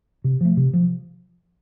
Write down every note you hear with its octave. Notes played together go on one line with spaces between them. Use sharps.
C3
F3 A3
C3
F3